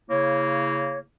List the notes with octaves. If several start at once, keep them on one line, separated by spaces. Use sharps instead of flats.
C#3 A#3 E4 C#5